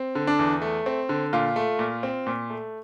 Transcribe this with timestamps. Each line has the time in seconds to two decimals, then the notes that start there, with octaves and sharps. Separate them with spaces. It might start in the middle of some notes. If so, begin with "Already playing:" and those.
Already playing: C4
0.15 D3
0.27 D4
0.39 E2
0.62 A3
0.86 C4
1.09 D3
1.33 A#2 F4
1.56 A3
1.79 A#2
2.03 C4
2.27 A#2
2.50 A3